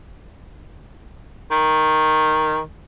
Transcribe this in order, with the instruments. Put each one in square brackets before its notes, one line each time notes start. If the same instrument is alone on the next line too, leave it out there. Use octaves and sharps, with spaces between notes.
[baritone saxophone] D#3